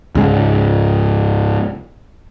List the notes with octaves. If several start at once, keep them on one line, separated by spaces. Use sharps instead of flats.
C#2 G#2 G#3